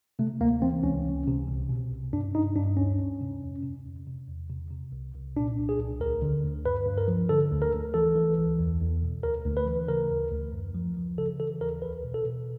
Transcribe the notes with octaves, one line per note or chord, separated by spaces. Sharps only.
C3 A3
D2 A#3
E3 C4
C#2 C#4
C#2
C3
C2
B2
C2
G2 D4
G2 D#4
G2 D4
D2 C#4
D2
C3
F2
C3
F2
C3
E2
C3
C3
C2
C2
A#2 D4
C2
G#4
C2
D2 A#4
D3
D2
G2 B4
G2
A#4
F3
D3 A4
D2
A#4
D2
E3 A4
E3
C#2
E2
E2
B2
D2 A#4
D2
B4
E3
C#3 A#4
D2
D2
F#2
F3
F3
C#3 A4
E3 A4
D#2 A#4
C#2 B4
B2
A4
B2